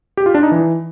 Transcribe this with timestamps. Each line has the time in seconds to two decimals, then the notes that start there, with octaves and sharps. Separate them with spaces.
0.17 G4
0.26 F4
0.34 D4
0.43 D#4
0.52 E3